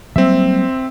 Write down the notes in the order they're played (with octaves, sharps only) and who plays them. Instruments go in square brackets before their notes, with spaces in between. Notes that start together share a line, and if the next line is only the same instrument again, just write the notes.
[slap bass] F#3 G3 A#3 [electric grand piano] C4 E5